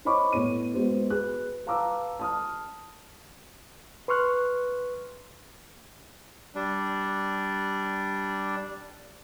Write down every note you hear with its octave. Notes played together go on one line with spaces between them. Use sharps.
C5 C#5 D#5 B5 C#6 D6
A2 B3 C#5 D#7
G#3 B3 F#4 C5
G#4 B4 F#6
B4 F5 A5 A#5 D6 E6
A5 D#6 F6
B4 C6 C#6 F6 F#6
G3 D4